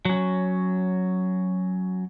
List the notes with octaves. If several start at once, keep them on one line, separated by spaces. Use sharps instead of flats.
F#3 C#4